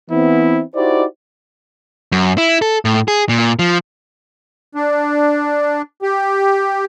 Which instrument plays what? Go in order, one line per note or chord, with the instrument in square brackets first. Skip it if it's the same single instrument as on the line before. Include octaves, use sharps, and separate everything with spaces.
[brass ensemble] E3 B3 C4 E4
D#4 E4 F#4 G4 C5 D5
[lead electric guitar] F#2
E4
A4
A2
G#4
A#2
F3
[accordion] D4
G4